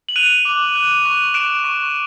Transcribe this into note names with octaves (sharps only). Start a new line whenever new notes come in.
F#7
F#6 D#7 F7
D6
F#6
C#6
F#6 D7 E7
C#6